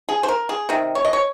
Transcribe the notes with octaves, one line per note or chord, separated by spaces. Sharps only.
G#4
C5
A#4
G#4
C3 D#3
C#5
D#5
C#5